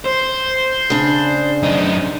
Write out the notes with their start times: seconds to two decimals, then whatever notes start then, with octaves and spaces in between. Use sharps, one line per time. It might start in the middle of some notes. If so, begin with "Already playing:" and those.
0.06 C5
0.90 C#3 D4
1.63 F#2 D#4